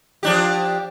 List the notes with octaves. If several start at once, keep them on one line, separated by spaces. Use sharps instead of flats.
F3 D4 G4